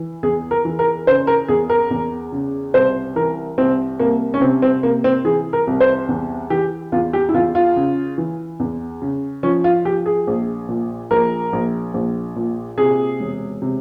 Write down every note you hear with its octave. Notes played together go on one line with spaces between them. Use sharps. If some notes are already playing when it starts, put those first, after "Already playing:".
Already playing: E3
E2 G#4
A#4
E3
A#4
C#3 C5
A#4
E2 G#4
A#4
E2
C#3
C2 C5
E3 A#4
C2 C4
C2 A#3
C#4
C3 C4
C4
C3 A#3
C4
E3 G#4
A#4
C2
C5
E2
E3 G4
E2 F4
G4
E4
E2 F4
F4
C#3
E3
E2
C#3
F3 C#4
F4
F3 G4
G#4
A#1
A#2
A#1 A#4
A#1
A#1
A#2
C3 G#4
E1
C3